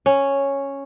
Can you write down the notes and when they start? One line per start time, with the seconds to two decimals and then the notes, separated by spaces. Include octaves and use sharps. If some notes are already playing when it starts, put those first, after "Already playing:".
0.06 C#4